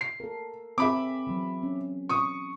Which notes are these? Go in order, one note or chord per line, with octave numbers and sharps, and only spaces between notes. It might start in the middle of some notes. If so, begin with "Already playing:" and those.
C7
A4 A#4
C4 G#4 E5 B5 D6
E3 F#3
C#4
C#6 D#6